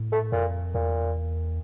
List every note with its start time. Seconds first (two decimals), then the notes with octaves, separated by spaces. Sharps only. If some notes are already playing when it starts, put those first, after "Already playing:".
Already playing: A2
0.12 A3
0.32 F2 A#2
0.75 E2 A#2